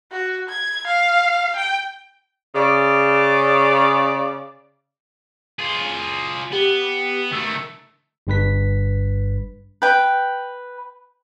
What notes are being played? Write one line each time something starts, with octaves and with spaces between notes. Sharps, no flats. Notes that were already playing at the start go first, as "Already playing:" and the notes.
F#4
G#6
F5
G5
C#3 D5
F4 G#4
B3 G4
D#3 A3 E6
G1 G2 B4 B6
B4 G5